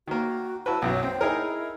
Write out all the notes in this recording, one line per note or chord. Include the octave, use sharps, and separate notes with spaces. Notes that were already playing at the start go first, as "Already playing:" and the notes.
D#3 A#3 F#4
E4 F#4 B4 A5
B1 F#2 F#3 G5
C4
D#4 E4 G#4 A#4